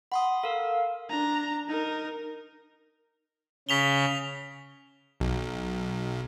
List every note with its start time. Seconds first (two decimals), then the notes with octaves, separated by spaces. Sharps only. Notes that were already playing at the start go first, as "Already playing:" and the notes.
0.12 F#5 B5 C6 D#6
0.43 A4 A#4 F5
1.10 D4 A#5
1.69 D#4 A#4
3.69 C#3 B6 F7 G7
5.20 B1